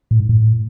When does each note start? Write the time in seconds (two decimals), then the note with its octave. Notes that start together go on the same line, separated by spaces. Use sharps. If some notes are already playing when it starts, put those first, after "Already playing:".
0.11 A2
0.20 G#2
0.29 A2